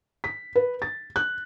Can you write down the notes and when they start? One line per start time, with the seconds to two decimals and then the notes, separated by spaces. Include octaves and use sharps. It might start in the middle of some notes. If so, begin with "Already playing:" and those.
0.24 B6
0.56 B4
0.82 A6
1.16 F#6